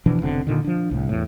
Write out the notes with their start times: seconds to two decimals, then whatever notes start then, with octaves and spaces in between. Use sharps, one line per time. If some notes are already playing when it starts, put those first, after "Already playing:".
0.06 B2 E3 F3 D4
0.22 F1 B2 D3 C4
0.47 A#2 D3 D#3
0.64 F3 D4
0.91 C2 A2
1.09 E2 A2